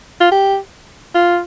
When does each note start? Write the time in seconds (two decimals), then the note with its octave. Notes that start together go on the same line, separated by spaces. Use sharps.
0.21 F4
0.32 G4
1.15 F4